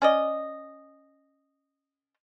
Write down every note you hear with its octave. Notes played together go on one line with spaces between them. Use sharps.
C#4 D5 D#5